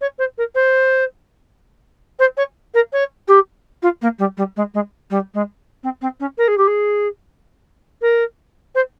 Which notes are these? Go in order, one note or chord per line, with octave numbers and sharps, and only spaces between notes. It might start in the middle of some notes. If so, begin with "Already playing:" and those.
C#5
C5
A#4
C5
C5
C#5
A#4
C#5
G4
F4
A#3
G3
G3
G#3
G#3
G3
G#3
C4
C4
C#4
A#4
G#4
G4
G#4
A#4
C5